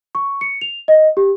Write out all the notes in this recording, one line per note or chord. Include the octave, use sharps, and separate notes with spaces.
C#6
C#7
F7
D#5
G4